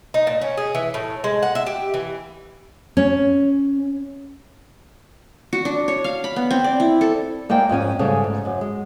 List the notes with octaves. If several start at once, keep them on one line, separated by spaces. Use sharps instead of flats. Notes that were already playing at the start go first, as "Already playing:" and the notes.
D#4
A#2
C#4
G#4
E3
A2
G#3
F#5
E5
G4
E3
C#4
F#4
D4
C#5
F5
B5
B3
C4
D5
E4
A4
G#3 A#3 C5 D5 G5
F2 G#2 C#4 G#5
G#2 C#3 G3 A3
G#2
F#2
G#3